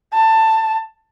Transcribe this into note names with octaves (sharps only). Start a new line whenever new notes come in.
A5